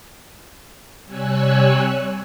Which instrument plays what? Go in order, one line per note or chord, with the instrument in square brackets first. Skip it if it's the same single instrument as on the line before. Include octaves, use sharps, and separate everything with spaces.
[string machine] C3 G3 C#5 G#5 E6 F#6